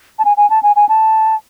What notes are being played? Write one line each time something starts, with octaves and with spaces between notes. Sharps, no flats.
A5
G#5
G#5
A5
G#5
G#5
A5